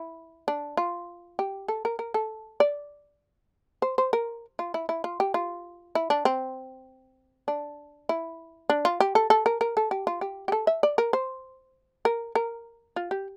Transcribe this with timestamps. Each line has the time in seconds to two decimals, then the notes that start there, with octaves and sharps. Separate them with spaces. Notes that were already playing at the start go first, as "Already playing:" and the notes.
Already playing: E4
0.48 D4
0.77 F4
1.39 G4
1.68 A4
1.85 A#4
1.99 A#4
2.14 A4
2.60 D5
3.82 C5
3.98 C5
4.13 A#4
4.59 F4
4.74 E4
4.89 E4
5.04 F4
5.20 G4
5.34 F4
5.95 E4
6.10 D4
6.25 C4
7.48 D4
8.09 E4
8.70 D4
8.85 F4
9.00 G4
9.15 A4
9.30 A4
9.46 A#4
9.61 A#4
9.77 A4
9.91 G4
10.07 F4
10.21 G4
10.48 G4
10.52 A4
10.67 E5
10.83 D5
10.98 A#4
11.13 C5
12.05 A#4
12.35 A#4
12.96 F4
13.11 G4